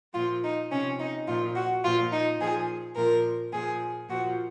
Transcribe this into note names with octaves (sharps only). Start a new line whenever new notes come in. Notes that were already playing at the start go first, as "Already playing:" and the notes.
A#2 F3 F4
D#4
C3 F3 C#4
D#4
A#2 F3 F4
F#4
A#2 F3 F4
D#4
A#2 F3 G#4
A#2 F3 A#4
A#2 F3 G#4
A#2 F3 F#4